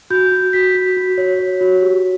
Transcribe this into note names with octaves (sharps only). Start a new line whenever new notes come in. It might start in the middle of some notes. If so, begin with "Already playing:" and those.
F#4 G6
F#4
F#4 B6
F#4
F#4
C#5
C#5
F#4
G4